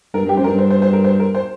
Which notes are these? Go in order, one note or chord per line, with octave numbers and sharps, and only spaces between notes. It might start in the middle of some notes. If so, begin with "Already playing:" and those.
G2 A#4
G2 G4
F#2 C5
A#4
G2
C5
C5
C5
A#4
C5
A#4
C5